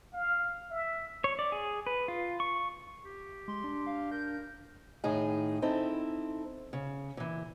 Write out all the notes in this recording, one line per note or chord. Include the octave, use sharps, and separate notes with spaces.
F5
E5
C#5
D5
G#4
B4
F4
C#6
G4
G#3 C6
D4
F5
A#4 G6
A2 D#3 D#4 G#4
C4 D#4 E4 A4
C#3
A#2 E3